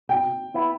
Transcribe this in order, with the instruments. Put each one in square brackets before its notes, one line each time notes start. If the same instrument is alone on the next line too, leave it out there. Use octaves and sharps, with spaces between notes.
[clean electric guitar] B2 [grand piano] G5
[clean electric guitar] B3 E4